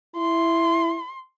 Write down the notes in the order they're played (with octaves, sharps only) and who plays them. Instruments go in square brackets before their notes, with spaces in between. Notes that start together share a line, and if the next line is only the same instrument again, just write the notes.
[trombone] E4 [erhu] C6